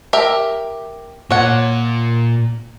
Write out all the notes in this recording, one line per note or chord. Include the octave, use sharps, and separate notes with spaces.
G4 A#4 E5
A#2 C#5 F#5